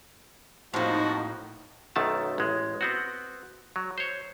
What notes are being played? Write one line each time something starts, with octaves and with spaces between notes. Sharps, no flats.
F2 A2 F3 A#3 D#4 F#4
B1 F#2 D#3 A3 A5
A1 G#3
B3 C4 F#4
F#3
C5 C#5